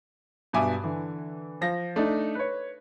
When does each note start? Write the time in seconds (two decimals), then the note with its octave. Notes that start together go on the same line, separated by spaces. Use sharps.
0.53 G2 B2 E5 G#5 D6
0.83 D3 E3
1.61 F3 A#6
1.96 A3 D4 D#4
2.35 B4 C#5